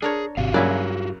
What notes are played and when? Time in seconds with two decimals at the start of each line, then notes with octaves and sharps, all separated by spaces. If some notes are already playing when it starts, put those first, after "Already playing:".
0.02 D4 G#4 A#4 C#5
0.37 G#1 C3 F#4 G4 F5
0.54 G2 C#3 F#3 A#3 C#4 E4 D5